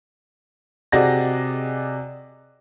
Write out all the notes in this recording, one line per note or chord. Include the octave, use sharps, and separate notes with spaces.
C3 F#4 G#4 D5 D#5 A#6